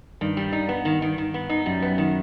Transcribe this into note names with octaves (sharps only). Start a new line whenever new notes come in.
G2 D#3
G3
D#4
B3
D#3
D#3
D#3
B3
D#4
F#2 G3
B3
D#3